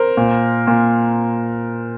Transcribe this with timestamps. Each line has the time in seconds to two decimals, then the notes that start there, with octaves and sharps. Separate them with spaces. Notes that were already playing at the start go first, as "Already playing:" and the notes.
Already playing: A#4 C5
0.17 A#2
0.67 A#2